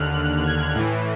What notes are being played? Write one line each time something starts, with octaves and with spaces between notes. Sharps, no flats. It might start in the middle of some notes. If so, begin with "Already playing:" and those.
Already playing: D#2 D3 F6 F#6
F#6
G#6
A2 E3